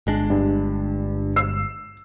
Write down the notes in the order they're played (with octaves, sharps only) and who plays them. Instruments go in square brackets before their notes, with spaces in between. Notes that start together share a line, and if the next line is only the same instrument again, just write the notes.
[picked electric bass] G1 G#3 D4
[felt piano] G2
E6 C7